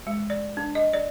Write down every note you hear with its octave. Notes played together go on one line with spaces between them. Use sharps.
G#3
D5
D4
D#5
D5